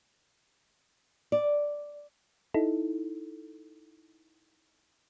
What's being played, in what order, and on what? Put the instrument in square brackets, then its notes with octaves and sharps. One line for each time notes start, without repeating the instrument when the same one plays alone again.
[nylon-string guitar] D5
[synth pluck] D#4 E4 A4